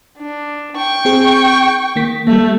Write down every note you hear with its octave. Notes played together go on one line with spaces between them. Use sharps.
D4
G5 C#6
C4 G#4
D#3 A#3 B6
G3 A3 A#3